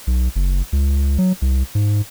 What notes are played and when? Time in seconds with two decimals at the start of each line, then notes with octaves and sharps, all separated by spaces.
0.07 B1
0.36 F#1
0.73 C#2
1.18 F#3
1.42 C2
1.75 G#2